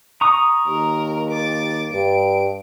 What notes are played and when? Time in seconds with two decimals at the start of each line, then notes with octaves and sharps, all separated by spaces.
0.21 A#5 C#6 D#6
0.67 D#2 A#4
1.31 D6 A6
1.92 G2 D7